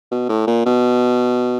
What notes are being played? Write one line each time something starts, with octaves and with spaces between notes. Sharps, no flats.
B2
A2
A#2
B2